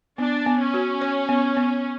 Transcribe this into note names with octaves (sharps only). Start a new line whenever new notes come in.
B3 D4
B3
C#4
F#4
C#5
B3
B3